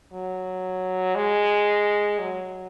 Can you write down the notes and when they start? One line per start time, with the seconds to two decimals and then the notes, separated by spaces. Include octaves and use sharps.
0.13 F#3
1.15 G#3
2.19 F#3